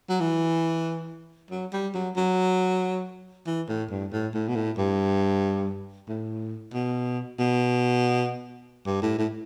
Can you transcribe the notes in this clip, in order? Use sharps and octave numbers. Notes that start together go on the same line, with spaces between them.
F#3
E3
F#3
G3
F#3
F#3
E3
A2
G2
A2
A2
B2
A2
G2
A2
B2
B2
G2
A2
A2